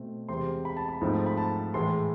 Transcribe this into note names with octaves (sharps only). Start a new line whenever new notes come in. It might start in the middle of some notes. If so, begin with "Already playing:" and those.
Already playing: B2 A3 C4
E2 C3 G#3 C4 C6
B5
A5
B5
G#2 F3 A3 C4
B5
A5
A2 E3 G#3 C6